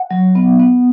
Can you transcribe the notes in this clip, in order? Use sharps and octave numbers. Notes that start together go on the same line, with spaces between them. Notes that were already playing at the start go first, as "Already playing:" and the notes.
Already playing: F#5
F#3
B3
B3